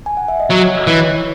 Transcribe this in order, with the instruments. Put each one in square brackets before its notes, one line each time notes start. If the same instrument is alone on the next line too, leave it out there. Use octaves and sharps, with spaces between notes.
[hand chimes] G#5
F#5
E5
D#5
[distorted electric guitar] F#3 [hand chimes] C#5
[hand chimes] C#5
D#5
[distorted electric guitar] E3
[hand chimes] C#5